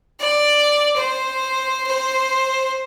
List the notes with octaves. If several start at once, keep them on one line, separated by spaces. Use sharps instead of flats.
D5
C5
C5